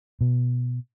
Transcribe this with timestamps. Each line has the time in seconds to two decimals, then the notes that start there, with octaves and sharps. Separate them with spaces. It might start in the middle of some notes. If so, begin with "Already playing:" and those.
0.21 B2